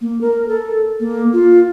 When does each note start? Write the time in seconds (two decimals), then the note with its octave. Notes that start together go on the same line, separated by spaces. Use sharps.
0.01 A#3
0.21 A#4
0.48 A4
1.00 A#3
1.33 F4